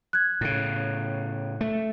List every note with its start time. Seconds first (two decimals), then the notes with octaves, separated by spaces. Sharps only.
0.13 F#6 G#6
0.41 A2 C#3
1.61 A3